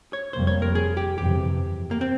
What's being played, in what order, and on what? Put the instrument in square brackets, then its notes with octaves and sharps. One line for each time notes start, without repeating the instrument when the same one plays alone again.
[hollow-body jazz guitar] C#5
[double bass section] F1 F2 C3 G3 A#3 [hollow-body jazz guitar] C5
[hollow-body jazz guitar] C#5
A#4
G#4
G4
[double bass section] G1 F2 C3 E3 [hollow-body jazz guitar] G4
[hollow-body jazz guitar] A#3
C4